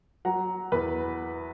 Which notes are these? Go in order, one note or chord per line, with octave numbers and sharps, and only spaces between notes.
F#3 F#5 A#5
E2 B4